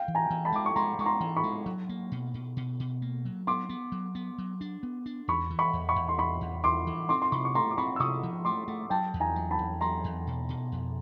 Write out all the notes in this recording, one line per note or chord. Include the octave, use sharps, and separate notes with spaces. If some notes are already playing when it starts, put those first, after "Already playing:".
Already playing: F5 G5
E3
G#5 A#5
E3
A5 B5
G#3 D6
C#6
G#3 A#5 C6
G#3 C#6
A#5 C6
E3
B5 C#6
G#3
F#3
A#3
B2
B2
B2
B2
A#3
F#3
B3 C6 D6
B3
F#3
B3
F#3
D4
B3
D4
E2 B5 C#6
E3
B5 C#6
E2
B5 C#6
E2
C6
E2 B5 C#6
E2
E2 C6 D6
E3
C4 C6 D6
C6
C3 B5 C#6
C#6
A3 A#5 C6
D6
C4 B5 C#6
E6
C3 C#6 D#6
F3
A3 C6 D6
A3
F#3 G5 A5
E2
G#5 A#5
F#3
A5 B5
E2
F#3 A#5 C6
E2
B2
B2
F2